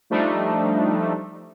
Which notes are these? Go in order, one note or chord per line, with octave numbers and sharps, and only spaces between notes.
F3 G3 A3 D4 D#4